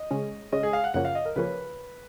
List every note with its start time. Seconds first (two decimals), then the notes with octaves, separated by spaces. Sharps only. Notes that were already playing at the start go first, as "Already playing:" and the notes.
Already playing: D#5
0.11 C#3 G#3 C#4
0.52 C#3 G#3 C#4 D#5
0.63 G#4
0.73 F5
0.84 F#5
0.94 F#2 C#3 F3 A#3 C#4 F#5
1.05 F5
1.15 D#5
1.25 A#4
1.36 C#3 F3 A#3 C#4 B4